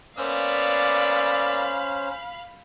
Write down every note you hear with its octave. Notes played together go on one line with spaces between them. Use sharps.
A#3 B3 C#4 C5 D5 F5 B5 E6